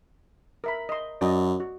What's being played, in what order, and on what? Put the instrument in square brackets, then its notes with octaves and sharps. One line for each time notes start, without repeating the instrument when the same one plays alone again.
[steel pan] A#4 E5 B5
D#5 C6
[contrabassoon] F#2 [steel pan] D5 D#5
[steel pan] F#4